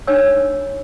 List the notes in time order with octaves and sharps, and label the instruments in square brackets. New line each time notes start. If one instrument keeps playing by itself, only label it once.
[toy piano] D4 D#4 C#5 G5 G#5 E6